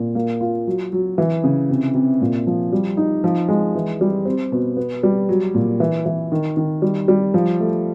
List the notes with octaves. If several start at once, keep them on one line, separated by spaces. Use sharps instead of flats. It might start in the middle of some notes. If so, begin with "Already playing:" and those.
Already playing: A#2
A#3
F4
F#3
F#3
E3
C#3
C3
C3
A#2
F3
G3
D#4
F3
G#3
E3
G3
C4
B2
B3
G3
F#3
A#2
E3
E3
D#3
D#3
G3
G3
F3
A3